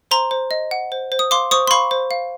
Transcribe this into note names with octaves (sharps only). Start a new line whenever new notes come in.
C5 A#5 C6
C5
D#5
F#5
C5
C5
D#6
F5 C6 D6
C5 C#6 D#6
C6
F5 B5 C#6
C5
F5